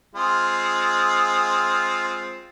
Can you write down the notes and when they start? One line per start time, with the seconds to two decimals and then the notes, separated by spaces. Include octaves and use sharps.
0.15 G#3 C4 F4